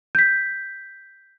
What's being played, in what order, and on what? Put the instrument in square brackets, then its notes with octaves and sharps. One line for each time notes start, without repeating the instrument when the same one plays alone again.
[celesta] G6 B6